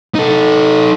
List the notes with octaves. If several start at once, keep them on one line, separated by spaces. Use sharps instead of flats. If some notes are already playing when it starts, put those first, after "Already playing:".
D#4 A4